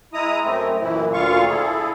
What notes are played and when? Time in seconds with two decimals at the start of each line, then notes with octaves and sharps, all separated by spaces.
0.14 G#3 E4 A#5 D#6
0.44 F#2 A3 C4
0.81 F#2 A#2 E3 E4
1.13 D2 A#2 D3 F4 F5 C#6
1.48 E4 G#4 A4